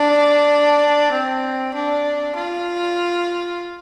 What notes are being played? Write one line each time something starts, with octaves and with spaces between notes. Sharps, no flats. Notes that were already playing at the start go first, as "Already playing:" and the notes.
Already playing: D4
C4
D4
F4